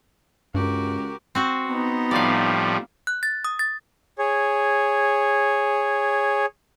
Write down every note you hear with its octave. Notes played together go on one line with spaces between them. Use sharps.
C#2 G2 F#4 G4 A#4
C4 F#4 C5
B3 D#4
A2 F3 G3 D5 F5
F#6
A6
D#6
A6
G#4 C#5